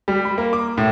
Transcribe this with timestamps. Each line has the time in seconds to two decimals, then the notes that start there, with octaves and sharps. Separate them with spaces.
0.08 G3
0.25 B5
0.38 A#3
0.53 D6
0.77 A2